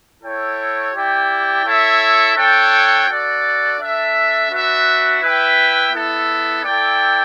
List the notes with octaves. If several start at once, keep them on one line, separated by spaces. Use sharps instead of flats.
E4 A4 C#5 G5
E4 G4 D5 G5
E4 A4 C#5 E5
D4 A4 C#5 G5
F#4 A4 D5
D4 A4 E5
D4 F#4 B4 E5
E4 B4 E5 G5
B3 E4 A4
E4 A4 D5 G5